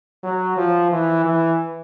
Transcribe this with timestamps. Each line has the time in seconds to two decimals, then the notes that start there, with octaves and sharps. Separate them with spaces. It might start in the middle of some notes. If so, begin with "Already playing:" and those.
0.23 F#3
0.57 F3
0.91 E3
1.24 E3